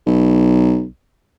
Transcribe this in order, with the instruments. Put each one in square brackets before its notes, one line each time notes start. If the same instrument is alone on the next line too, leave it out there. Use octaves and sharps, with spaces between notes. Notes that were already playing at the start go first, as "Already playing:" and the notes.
[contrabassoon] B1